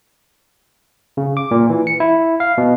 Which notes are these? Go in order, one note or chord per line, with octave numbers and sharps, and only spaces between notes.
C#3
D6
A#2
E3
C#7
E4
F5
B2